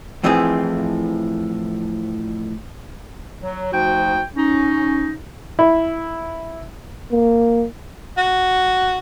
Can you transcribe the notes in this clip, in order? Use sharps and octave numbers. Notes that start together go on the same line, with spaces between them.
F2 A2 E3 F3 C4 G#4
F#3
D2 F3 D#4 F#4 G5
C#4 D#4
E4
A#3
F#4